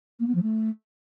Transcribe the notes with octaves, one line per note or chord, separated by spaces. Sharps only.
A#3
B3
F3
A3